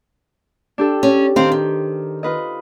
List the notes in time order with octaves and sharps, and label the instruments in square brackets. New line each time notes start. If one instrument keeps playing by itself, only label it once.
[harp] D4 G4 A4
[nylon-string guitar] C#4
[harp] D#3 C5 [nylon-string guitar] C4 F5
[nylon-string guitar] G4
[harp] F4 B4 D#5